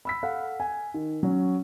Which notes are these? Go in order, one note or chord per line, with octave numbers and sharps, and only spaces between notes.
B5 E6 B6
A4 F5 F#5
G#5
D#3
F#3 C#4